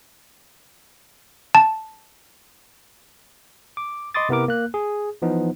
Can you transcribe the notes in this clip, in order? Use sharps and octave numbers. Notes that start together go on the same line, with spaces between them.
A5
D6
D#5 B5 C6 D6 D#6 A6
C3 B3 E4 A#4 D6
A#3 F#6
G#4
E3 F3 B3 D#4